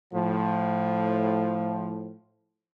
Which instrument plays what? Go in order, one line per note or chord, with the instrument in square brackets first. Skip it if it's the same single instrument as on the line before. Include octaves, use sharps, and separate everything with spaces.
[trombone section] A2 F3